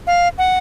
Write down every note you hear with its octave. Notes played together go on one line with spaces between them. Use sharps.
F5
F#5